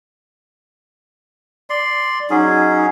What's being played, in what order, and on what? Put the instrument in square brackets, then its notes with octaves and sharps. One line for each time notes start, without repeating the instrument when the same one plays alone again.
[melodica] D5 C6
[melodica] F#3 C#4 G#4 [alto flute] D#4